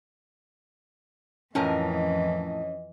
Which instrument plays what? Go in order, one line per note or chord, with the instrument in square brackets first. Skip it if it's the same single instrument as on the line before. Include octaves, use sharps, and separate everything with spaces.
[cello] F2 E3 [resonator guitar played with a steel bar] A2 F3 A#4 [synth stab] C#4 [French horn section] D#5